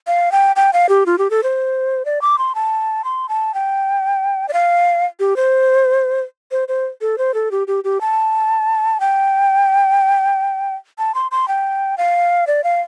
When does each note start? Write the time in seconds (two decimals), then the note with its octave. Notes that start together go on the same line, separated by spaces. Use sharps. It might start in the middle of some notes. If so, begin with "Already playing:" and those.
0.07 F5
0.32 G5
0.56 G5
0.73 F5
0.89 G4
1.06 F4
1.18 G4
1.31 A4
1.43 C5
2.05 D5
2.22 D6
2.38 C6
2.55 A5
3.04 C6
3.29 A5
3.54 G5
4.48 D5
4.53 F5
5.20 G4
5.36 C5
6.51 C5
6.68 C5
7.01 A4
7.18 C5
7.34 A4
7.51 G4
7.67 G4
7.84 G4
8.01 A5
9.00 G5
10.98 A5
11.15 C6
11.31 C6
11.48 G5
11.98 F5
12.47 D5
12.64 F5